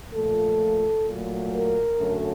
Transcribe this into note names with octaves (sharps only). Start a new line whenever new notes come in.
A#2 F3 A3 A4
A#2 F#3 A3
A#4
F#2 D3 F#3 A3